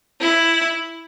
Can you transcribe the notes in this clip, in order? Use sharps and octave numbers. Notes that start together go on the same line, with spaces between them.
E4